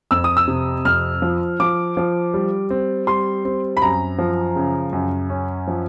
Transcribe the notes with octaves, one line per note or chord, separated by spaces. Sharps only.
F2 E6
D#6
E6
C3
F2 F6
F3
F3 D6
F3
G3
C4
G3 C6
C4
B5
F#2 A#5
F3
C#3
F#2
C#4
F3